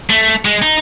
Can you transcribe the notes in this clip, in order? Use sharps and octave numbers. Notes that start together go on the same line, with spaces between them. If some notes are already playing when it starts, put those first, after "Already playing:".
A3
G#3
D#4